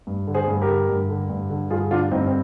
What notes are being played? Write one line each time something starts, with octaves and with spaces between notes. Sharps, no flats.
G2
D3
G#4 C5
G2
G4 A#4
D3
G2
D3
G2
D3
G2 F4 G#4
D3 D4 F4
G2 C4 D#4
C4